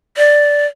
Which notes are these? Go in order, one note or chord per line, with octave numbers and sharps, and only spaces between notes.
D5